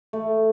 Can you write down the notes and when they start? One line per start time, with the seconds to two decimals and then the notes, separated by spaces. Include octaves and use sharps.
0.13 A3